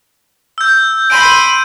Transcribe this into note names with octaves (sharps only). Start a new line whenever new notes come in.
E6 G6
B5 C6 D7 D#7